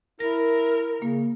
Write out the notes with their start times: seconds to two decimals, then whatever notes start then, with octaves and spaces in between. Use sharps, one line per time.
0.20 E4 A#4 A#6
1.02 C#3 A#3